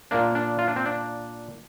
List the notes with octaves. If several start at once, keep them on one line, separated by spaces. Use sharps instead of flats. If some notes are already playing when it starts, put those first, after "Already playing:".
A#2 A#3 D4
D4
F4
D4
C4
D4